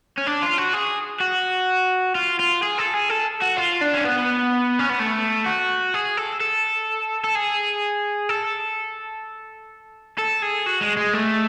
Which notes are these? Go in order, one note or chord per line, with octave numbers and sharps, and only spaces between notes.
C#4
D4
F4
F#4
G#4
F#4
F4
F4
G#4
A4
G#4
A4
F#4
F4
D4
C#4
B3
C#4
B3
A3
F#4
G#4
A4
A4
A4
G#4
A4
A4
G#4
F#4
G#3
G#3
A3